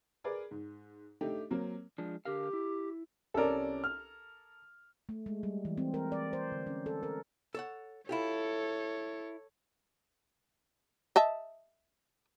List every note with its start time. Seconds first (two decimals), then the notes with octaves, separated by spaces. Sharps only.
0.24 G#4 A#4 B4 D5
0.51 G#2
1.21 A3 D4 D#4 G4
1.50 F#3 A#3 C4
1.98 F3 G#3 D4
2.25 D3 G4 A#4 F5
2.53 E4
3.34 C2 C#4 A4 A#4 D5
3.84 F6
5.09 A3
5.26 G#3
5.43 G3
5.65 E3
5.78 C4
5.94 A#4
6.12 D5
6.33 C5
6.52 D3
6.67 C#4
6.86 A4
7.03 A#4
7.55 A4 C#5 F#5
8.09 E4 F4 G4 A4 C#5
11.16 D#5 E5 A5